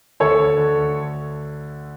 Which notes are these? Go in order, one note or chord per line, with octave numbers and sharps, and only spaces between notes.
D2 A4 C#5
D2
D3
D2